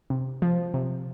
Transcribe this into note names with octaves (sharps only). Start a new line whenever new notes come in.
C3
F3
C3